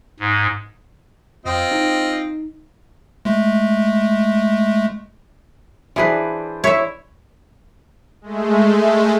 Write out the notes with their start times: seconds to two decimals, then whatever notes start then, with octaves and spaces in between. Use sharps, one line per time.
0.20 G#2
1.45 F2 C4 F4 D#5
1.71 D#4
3.25 G#3 A3
5.96 E3 D4 G#4 B4 C5 D5
6.64 E4 C#5 E5
8.21 G#3 A3